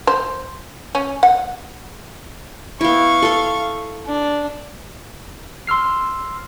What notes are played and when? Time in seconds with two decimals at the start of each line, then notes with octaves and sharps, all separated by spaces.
0.07 C5
0.95 C#4
1.23 F#5
2.81 B3 E4 F5 C#6
3.23 A4 C6
4.06 D4
5.67 C6 E6 F6 C7